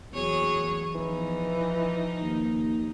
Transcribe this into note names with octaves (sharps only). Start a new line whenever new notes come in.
E2 F#3 G#4 C#5
E3 F3 D#4
D#2